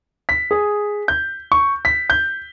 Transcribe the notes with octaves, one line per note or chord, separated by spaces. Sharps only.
B6
G#4
G6
C#6
B6
G6